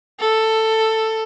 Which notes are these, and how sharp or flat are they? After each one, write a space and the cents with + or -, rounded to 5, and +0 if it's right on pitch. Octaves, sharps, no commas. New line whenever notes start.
A4 +10